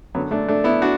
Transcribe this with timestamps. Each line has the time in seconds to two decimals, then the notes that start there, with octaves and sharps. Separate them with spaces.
0.14 F#2 F#3 B3
0.17 D3
0.31 A3 D4
0.49 A3 D4
0.64 B3 E4
0.82 D4 F#4